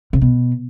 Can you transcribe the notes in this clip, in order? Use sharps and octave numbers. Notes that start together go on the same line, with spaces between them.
C#3
B2